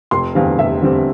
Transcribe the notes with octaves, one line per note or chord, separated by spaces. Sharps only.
F1 C6
E2 D3 G3 C4 F5
F1 E5
E2 D3 G3 C4